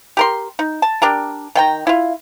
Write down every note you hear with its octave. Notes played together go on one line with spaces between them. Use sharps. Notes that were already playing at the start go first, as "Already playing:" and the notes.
G4 A#4 C6
D#4
A5
D4 G4 A#4
D#3 G5 A#5
E4 F4